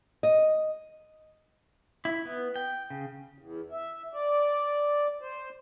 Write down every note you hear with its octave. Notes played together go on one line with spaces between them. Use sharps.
D#5
E4
B3
G5
C#3
E2
E5
D5
C5